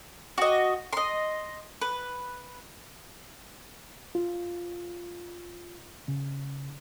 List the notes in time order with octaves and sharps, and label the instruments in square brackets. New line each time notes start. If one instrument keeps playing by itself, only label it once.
[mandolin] F#4 D#5
D#5 C6
B4
[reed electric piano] F4
C#3